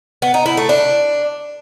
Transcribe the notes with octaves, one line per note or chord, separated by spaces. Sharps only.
B3
D#4
E4
A3
D4